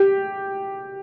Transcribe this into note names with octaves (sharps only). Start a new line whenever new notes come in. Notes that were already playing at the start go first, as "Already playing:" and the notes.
Already playing: G4